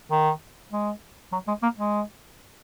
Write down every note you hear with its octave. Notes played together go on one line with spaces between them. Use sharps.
D#3
G#3
F#3
G#3
A#3
G#3